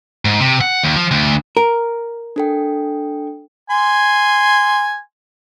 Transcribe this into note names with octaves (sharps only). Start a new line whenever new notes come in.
G#2
C3
F#5
D#2
F3
D2
A#4
D4 A4 G5
G#5 C6